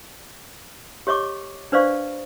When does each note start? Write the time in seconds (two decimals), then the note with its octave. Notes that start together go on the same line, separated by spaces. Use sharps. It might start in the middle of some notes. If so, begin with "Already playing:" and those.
1.07 G4 C#5 D#5 C#6 D6
1.72 D4 B4 C5 D5 F5 C#6